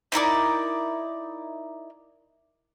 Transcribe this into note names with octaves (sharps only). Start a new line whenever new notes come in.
D#4 E4 A#4 D5